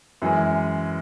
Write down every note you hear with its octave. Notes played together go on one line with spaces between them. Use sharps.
F#2 E3 G#3